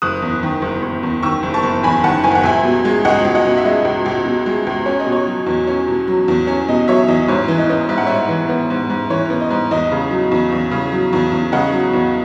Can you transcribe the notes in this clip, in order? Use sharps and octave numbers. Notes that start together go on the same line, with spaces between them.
F#1 D#6 F#6
E2
D#3
F#1
F#1
E2
D#3 C#6 E6
F#1
A5 C#6
F#1
E2 G#5 B5
D#3 F#5 A5
F#1 G#5
F#5
C#2 E5 G#5
B2
G#3
C#2 D#5 F#5
C#2
D#5 F#5
B2
E5
G#3 D#5
C#2
C#2
B2
G#3
C#2
C#4 C#5
D#5
B2
C#5
F#3
E2
C#4
B2
F#3
E2
C#4
B2 D#5
F#3 C#5 E5
E2 D#5
G#2 C#5
E3
D#5
B3
G#2 E5
F#5
G#2 C#5 E5
E3
B3
G#2
G#2
E3 C#5
B3
D#5
G#2
E2 D#5
C#3
F#3
E2
E2
C#3
F#3
E2
E2
C#3 D#5 F#5
F#3
E2